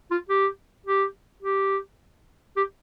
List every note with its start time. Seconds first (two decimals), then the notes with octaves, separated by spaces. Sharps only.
0.11 F4
0.29 G4
0.86 G4
1.43 G4
2.57 G4